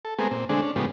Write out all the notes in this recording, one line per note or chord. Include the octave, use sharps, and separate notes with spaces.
A4
G#3 A3 B3 C4 G#4 A#4
A#2 C4
D3 G#3 A3 C4 D4 G#4
C#4 D4
A2 C#3 F3 G#3 B3 G4